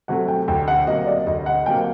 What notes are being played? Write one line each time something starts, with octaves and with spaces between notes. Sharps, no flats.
C3 F#3 A3 F#5
G5
D2 G5
F#5
C3 F#3 A#3 D#5
D5
D2 D#5
F#5
C3 F#3 A#3 G5